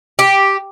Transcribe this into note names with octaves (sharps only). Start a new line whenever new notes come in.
G4